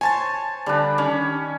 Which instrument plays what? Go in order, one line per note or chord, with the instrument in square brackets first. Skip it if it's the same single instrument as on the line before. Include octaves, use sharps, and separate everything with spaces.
[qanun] C5 C#5 [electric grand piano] G#5 A5 A6
[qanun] D3 [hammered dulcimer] G3 D4
[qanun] D#3 D4 [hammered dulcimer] C#4